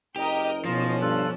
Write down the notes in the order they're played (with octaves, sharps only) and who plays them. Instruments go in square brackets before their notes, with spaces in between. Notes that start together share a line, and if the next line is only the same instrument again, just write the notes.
[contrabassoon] F#1 [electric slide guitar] G4 [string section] A#4 D#5 G5
[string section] B2 C#4 [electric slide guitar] F3 [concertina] F4 D#5
[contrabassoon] G2 [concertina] F4 A4 F#6